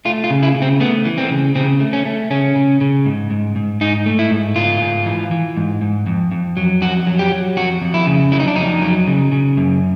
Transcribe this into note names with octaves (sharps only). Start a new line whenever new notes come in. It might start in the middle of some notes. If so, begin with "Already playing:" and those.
A3 F4
F4
C#3
E4
C#3
C4
A3 B3
E3
C4
C#3
C#3 C4
A3
C#4
A3
C#3 C#4
C#3
C#3
G#2
G#2
G#2
G#2 D#4
A3
E4
G#2
G#2 F4
G#2
E3
E3
G#2
G#2
F2
F2
F#3
F2 F#4
F#3
G4
F#3
F2 F#4
F2
E4
C#3
F#3 E4
D#4
D4
F2 D#4
F#3
C#3
C#3
F#2